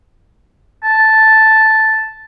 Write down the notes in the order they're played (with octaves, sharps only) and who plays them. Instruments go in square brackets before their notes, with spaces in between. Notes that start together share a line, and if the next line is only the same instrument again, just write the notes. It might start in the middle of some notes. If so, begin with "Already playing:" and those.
[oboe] A5